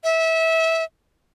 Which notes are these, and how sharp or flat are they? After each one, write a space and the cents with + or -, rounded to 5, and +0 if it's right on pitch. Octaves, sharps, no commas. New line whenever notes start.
E5 -25